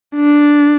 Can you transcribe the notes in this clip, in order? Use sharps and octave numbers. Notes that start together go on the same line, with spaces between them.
D4